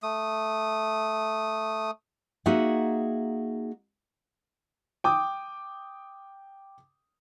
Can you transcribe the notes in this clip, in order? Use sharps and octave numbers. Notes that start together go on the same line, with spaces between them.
A3 D#6
A#3 D#4 F#4 G#4 E5 F#5
G5 D6 D#6